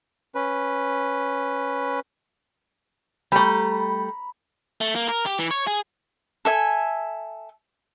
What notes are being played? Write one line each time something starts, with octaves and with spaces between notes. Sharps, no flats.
C#4 B4
G3 A3 A#5 B5
A3
A#3
A#4
G4
E3
C#5
G#4
A4 E5 G#5